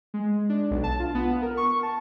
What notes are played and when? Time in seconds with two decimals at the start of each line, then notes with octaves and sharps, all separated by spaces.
0.14 G#3
0.49 D4
0.71 B1
0.84 A5
1.00 F4
1.15 B3
1.42 A#4
1.57 C#6
1.83 A5